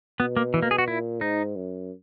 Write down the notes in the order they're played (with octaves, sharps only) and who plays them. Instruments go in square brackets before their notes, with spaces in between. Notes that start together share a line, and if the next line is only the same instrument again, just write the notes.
[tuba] B2 [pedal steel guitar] B3
[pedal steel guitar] A#3
E3
A#3
G#4
F#4
[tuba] A#2 [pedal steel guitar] E4
[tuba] G#2 [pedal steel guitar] D#4
[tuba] F#2